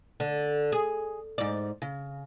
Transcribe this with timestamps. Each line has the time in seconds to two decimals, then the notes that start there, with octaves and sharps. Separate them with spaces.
0.20 D3
0.72 G#4
1.38 G#2 D5
1.82 C#3